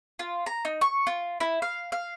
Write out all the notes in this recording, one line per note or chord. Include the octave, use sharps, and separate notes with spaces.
F4
A#5
D#4
C#6
F4
E4
F5
F5